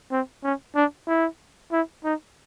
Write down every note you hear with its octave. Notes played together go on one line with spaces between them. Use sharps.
C4
C#4
D4
E4
E4
D#4